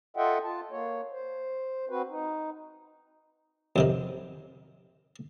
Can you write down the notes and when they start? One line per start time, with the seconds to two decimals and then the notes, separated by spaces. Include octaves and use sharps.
0.17 F4 A4 D#5 E5 F#5 G5
0.43 F4 A5
0.71 A#3 C#5
1.12 C5
1.89 C4 F#4 B4
2.09 D#4
3.76 F2 C3 D#3